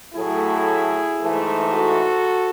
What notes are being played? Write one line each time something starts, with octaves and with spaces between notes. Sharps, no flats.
A2 F#3 A3 E4 G#4
G#2 E3 A3
F#4 A4